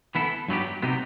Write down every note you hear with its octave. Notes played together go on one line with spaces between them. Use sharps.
E3 B3 E4 A4
G2 F#3 B3 D#4 G4
C3 F#3 B3 D#4 G4